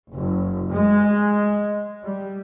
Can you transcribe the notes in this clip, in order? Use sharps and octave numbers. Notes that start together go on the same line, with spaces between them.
F#1
G#3
G3